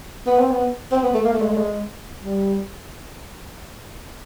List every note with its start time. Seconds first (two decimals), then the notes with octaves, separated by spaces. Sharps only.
0.26 B3
0.38 C4
0.51 B3
0.92 C4
1.03 B3
1.14 A3
1.25 A#3
1.33 A3
1.41 G#3
1.49 A3
1.57 G#3
2.23 G3